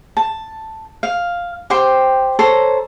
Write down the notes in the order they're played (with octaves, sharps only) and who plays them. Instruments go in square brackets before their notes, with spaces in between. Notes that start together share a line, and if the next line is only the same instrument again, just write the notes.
[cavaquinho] A5
F5
G4 C5 G5 C6
A4 C5 C#5 A#5